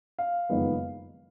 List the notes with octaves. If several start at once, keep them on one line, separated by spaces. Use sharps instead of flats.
F5
F#1 F2 D#3 G#3 B3